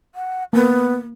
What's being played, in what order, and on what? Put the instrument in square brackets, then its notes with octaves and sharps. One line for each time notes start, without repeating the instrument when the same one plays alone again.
[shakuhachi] F#5
[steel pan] A#3 [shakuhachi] B3